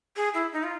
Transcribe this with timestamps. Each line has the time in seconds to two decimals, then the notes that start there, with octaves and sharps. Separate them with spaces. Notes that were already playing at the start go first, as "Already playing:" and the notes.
0.16 G#4
0.34 E4
0.52 D#4
0.63 F4